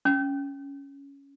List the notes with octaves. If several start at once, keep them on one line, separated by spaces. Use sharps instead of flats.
C#4